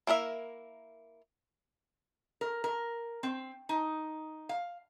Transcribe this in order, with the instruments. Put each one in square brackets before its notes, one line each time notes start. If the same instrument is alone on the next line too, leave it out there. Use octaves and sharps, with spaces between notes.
[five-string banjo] A#3 E4 A#4 E5
[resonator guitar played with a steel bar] A#4
A#4
C4
D#4
F5